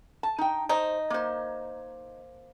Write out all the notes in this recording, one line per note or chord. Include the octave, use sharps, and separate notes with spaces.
A5
D#4 G5
D#4 C5
A#3 C5